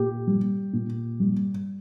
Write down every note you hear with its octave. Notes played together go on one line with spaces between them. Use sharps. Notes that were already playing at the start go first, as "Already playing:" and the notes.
Already playing: A#2 G4
G3
A#2
G3